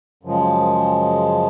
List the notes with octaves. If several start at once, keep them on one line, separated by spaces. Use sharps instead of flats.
F#2 C#3 F3 G#3